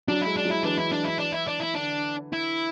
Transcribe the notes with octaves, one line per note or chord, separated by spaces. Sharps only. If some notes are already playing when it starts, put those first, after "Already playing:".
F#3 D4
G#3 E4
D4
F#3 E4
E3 D4
E4
D4
E4
D4
E4
D4
E4
D3 D4
E4